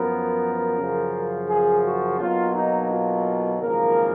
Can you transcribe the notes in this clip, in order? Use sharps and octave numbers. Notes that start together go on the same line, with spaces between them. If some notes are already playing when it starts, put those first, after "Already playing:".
Already playing: F#2 F3 B3 A#4
F#2 C#3 F3
G#4
F#4
B1 B2 F#3 A#3 F4
D#4
F4
G#1 F#2 C#3 F3 A#3 A#4